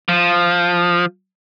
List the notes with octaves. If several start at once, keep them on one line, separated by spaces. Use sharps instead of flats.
F3